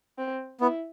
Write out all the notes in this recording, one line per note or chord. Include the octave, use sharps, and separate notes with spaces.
C4
B3 E4